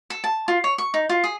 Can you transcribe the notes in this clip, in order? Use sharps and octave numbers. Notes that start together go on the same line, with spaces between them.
A4
A5
F4
C#5
C#6
D#4
F4
G#4